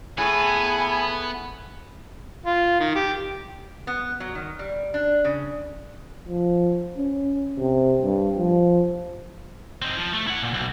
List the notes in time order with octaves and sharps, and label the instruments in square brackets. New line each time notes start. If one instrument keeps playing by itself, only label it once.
[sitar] A2 [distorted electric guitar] B3 [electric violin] G#4 G#5
[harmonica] F4
D#3
G4
[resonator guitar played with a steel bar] B3
F#3
D#3
G3
D4
C#3
[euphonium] F3
C#4
C3
G2
F3
[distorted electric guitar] C4 D#4
F3
A3
E4 F#5
A#2
B1